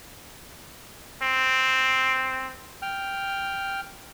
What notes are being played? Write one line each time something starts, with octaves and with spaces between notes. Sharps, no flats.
C4
G5 F6